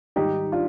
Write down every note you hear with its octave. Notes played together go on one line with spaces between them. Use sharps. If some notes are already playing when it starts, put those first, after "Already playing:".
G#2 D#3 G3 D#4 G4
D4 F4